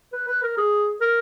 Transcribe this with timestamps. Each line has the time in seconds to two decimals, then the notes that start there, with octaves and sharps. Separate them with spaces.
0.13 B4
0.28 B4
0.43 A#4
0.57 G#4
1.01 A#4